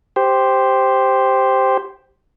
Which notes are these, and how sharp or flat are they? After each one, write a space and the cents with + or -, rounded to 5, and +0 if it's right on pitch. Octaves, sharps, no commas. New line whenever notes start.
G4 +0 C5 +0